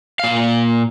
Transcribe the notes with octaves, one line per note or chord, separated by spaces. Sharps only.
A#2 F5